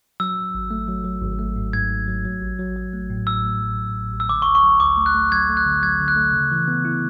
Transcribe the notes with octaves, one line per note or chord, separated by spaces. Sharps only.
F#3 E6
F#3
G#1
A3
F#3
F#3
G#1
A3
G#2
G#2 G#6
G#2
F#3
F#3
A1
F#3
F#3
A3
A2
A2 E6
A3
F#3
A2
A2
A1
E6
D3 D6
C#6
D2
C#6
F#3
D2 D6
A3
F#6
A3
F#3 G#6
A3
F#6
D3
F#3 G#6
D3
F#6
A3
C#3
E3
B3
E4